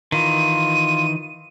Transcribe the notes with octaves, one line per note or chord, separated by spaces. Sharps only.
D#3 E3 F4 D#7